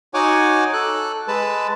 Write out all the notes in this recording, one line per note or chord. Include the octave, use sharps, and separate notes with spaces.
D#4 F#4 C#5 F#5 G#5 D6
A4 F#6
G#3 B4 A5